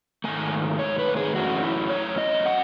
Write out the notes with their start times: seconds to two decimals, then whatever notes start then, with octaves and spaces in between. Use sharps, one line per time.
0.24 G#2 D#3 A3 G#5
0.79 C#5
0.99 B4
1.17 G#4
1.35 F#2 E3 A3 C#4 F#4
1.62 E4
1.89 C#5
2.18 D#5
2.45 F#3 C#4 F#5